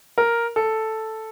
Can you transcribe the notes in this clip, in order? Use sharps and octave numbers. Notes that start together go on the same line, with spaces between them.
A#4
A4